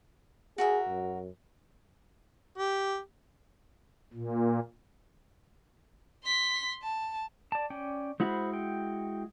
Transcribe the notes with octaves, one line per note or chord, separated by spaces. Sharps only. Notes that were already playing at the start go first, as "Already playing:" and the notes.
F#4 G#4 A#4 E5
F#2
G4
A#2
C6 B6
A5
D5 A5
C#4 D5 G5
G#3 E4 F#4 C5 F#5 B5
G5